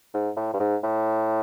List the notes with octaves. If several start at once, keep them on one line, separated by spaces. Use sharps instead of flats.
G#2
A2
G2
G#2
A2